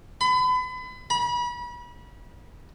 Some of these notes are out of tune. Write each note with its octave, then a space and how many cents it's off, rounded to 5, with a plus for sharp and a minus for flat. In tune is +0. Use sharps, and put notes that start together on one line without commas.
B5 +35
B5 -35